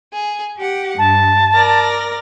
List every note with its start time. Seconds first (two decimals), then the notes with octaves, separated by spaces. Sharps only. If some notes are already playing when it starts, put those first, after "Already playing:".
0.13 G#4
0.58 G4 F#5
0.98 G2 A5
1.54 A#4 D5 A#6